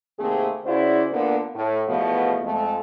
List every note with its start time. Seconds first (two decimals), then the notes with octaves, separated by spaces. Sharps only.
0.19 C3 D#3 A3 A#3 C4 G#4
0.66 C#3 E4 F#4 C5 D5
1.12 A#2 D3 B3
1.55 A2
1.88 E2 B2 F3 A3 B3
2.43 F2 G#3 A3